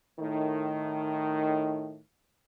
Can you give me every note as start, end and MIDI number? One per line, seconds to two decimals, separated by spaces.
0.20 1.99 45
0.20 1.99 51